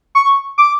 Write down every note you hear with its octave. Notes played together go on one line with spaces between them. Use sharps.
C#6
D6